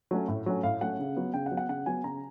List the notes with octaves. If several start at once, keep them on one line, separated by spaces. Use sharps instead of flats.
F#3 A3 C#4
A2
F#3 A3 C#4
A2 F5
F#3 A3 C#4 F#5
C#3
F#3 B3
C#3 G5
F#5
F#3 B3
F#5
C#3 F#5
F#3 B3 G#5
C#3 A#5